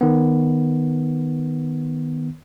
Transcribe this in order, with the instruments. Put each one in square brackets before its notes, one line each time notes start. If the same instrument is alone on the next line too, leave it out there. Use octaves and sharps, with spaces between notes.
[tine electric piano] D#3 B3